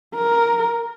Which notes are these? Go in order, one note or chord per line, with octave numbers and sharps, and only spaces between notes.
A#4